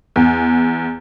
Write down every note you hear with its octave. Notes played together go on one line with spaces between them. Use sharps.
E2